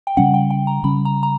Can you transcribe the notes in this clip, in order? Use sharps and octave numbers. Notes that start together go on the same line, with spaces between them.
G5
C#3 G3 C#4 F#5
G5
G5
A#5
C#3 G3 C#4 B5
A#5
A#5